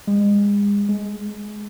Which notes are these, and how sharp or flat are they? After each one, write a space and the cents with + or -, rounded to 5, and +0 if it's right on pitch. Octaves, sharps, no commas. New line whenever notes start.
G#3 -35
G#3 +15